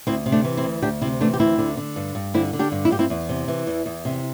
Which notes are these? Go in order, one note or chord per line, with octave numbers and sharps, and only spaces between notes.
D2 C4 E4
C3
A3 D4
E3
C4 E4
D2
D2 D4 G4
C3 C4 E4
E3 A3 D4
G4
D2 C4 E4
D3
D3
G2
G2
D3 C4 E4
D3
D4 G4
G2
E4
G2 G4
C4 E4
E2
C3
E3
E2
E2
C3